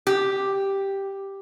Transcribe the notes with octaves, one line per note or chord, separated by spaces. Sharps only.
G4